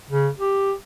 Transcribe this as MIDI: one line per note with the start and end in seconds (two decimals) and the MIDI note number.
0.10 0.28 49
0.38 0.73 67